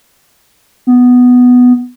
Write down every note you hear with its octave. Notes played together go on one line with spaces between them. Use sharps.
B3